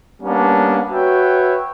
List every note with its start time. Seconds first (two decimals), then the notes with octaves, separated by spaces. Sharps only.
0.22 G3 A#3 B3 C#4 D4
0.91 F#4 B4 C#5 E5 G5